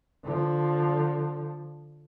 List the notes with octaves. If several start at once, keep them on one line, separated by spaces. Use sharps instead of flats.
D3 F3